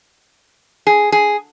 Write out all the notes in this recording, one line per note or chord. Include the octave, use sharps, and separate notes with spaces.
G#4
G#4